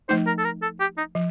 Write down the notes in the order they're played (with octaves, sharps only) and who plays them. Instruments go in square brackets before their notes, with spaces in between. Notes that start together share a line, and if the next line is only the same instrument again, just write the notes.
[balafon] F3 A3 D#4 [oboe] C5
[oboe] A#4
A4
A#4
A4
G4
D#4
[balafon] F3